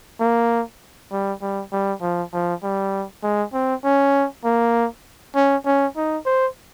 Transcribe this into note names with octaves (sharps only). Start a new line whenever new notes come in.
A#3
G3
G3
G3
F3
F3
G3
G#3
C4
C#4
A#3
C#4
C#4
D#4
C5